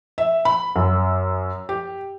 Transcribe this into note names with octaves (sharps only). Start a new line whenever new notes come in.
E5
B5
F#2
G4